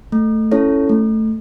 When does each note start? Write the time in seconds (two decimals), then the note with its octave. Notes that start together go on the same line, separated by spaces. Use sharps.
0.12 A3
0.51 C#4 E4 A4 C#5
0.89 A3